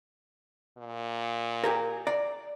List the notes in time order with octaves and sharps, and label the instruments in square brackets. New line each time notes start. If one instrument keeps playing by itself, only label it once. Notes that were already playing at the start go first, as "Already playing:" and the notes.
[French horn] A#2
[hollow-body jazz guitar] G4 G#4 A#4
D5 A#5